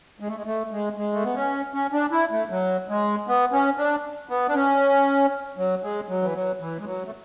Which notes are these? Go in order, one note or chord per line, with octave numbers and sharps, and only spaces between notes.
G#3
A3
G#3
A3
G#3
G#3
A3
B3
C#4
C#4
D4
E4
A3
F#3
G#3
B3
C#4
D4
B3
D4
C#4
F#3
G#3
F#3
E3
F#3
E3
G#3
F#3
A3